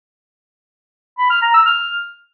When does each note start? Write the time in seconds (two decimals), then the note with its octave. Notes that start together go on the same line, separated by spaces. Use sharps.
1.18 B5
1.30 F6
1.42 A#5
1.54 E6
1.65 F6